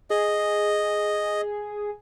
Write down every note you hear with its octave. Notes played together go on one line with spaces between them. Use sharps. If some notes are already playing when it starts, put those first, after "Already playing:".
G#4 D#5